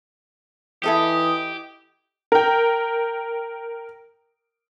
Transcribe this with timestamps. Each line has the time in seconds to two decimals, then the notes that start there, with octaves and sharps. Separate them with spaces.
0.84 E3 E4 G4 A4 D#5 D#6
2.32 A#4 G5